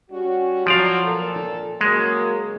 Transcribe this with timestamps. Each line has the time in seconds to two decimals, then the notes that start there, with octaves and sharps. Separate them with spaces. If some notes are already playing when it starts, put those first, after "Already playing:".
0.10 G3 C#4 F#4
0.66 F3 F#3 D5 F5
1.04 A#2 A4
1.81 C#3 F#3 G#3 A#3